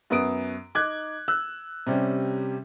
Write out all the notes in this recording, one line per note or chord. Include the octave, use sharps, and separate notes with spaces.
F#2 B3 D#6 D7
D#4 D6 F#6 G#6
E6 F#6
C3 G3 C#4